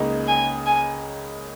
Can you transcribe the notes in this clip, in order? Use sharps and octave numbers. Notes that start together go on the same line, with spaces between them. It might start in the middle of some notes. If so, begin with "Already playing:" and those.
Already playing: C#2 C#3 A#3 D#4 G#4
G#5
G#5